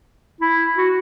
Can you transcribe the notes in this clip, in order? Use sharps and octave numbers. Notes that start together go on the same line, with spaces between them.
E4
F#4